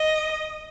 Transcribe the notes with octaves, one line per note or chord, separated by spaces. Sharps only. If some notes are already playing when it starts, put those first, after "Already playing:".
Already playing: D#5